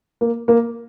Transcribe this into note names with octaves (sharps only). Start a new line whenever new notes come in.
A#3
A#3